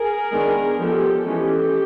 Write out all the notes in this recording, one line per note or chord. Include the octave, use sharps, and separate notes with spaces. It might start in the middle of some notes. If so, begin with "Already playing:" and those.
Already playing: G#4 A#4
D#3 G#3 B3 D4
F3 G#3 B3 G4 A4
E3 G#3 C#4 G4 A4